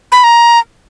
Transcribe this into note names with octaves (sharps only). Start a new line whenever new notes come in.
B5
A#5